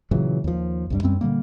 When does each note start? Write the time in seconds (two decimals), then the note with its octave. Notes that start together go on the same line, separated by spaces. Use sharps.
0.11 A#2 C#3 E3 F#3
0.44 D#2 F3
0.90 C2 G2 G3
1.03 F#2 G3 C4 C#4
1.21 A#2 D3 G3 A#3